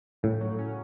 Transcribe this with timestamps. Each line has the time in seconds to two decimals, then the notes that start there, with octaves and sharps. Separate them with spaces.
0.23 A2 C#3
0.41 F#3
0.58 C#4